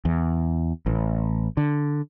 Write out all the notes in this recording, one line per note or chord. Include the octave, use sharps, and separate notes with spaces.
E2
A1
D3